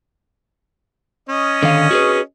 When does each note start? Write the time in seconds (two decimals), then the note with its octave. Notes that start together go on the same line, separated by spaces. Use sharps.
1.29 C#4 D#5
1.63 D3 D#3 F5
1.91 F#4 G#4 B4